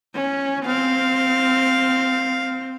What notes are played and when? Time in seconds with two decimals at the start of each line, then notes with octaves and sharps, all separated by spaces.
0.15 C#4
0.66 C4 F5